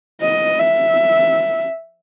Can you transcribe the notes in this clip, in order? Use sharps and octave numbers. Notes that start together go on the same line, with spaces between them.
D#5
E5